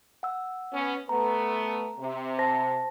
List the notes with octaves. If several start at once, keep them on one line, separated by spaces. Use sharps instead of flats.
F#5 E6
B3 C#4
A3 B3 A#5
C3
C5 A5 A#6